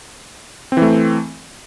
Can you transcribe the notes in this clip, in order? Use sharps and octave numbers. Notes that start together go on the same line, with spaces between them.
E3 A3 C4